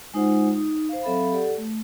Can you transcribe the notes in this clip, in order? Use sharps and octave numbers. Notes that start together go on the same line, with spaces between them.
G#3 D#4 F4 C5 F#5
D#4
C5 F5
F#3 C4 A4 E5 F5 B5
G4 A4 D5 F#5
A3